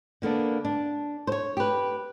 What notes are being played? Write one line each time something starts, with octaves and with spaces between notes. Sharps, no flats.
D3 A#3 B3 D4
D4
C5 C#5
G4 B4